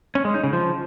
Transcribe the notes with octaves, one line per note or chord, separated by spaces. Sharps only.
C#4
G#3
D#4
C#3
F3